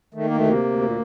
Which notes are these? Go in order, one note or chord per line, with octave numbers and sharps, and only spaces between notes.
D#3 A3
A#3
D2
A3
C3 A#3
D2
A#2